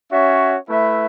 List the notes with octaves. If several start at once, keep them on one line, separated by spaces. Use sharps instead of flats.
C#4 F#4 C#5 E5
A3 E4 B4 E5